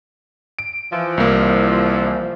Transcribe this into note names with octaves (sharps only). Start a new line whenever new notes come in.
D7
E3 F3
C2 A#3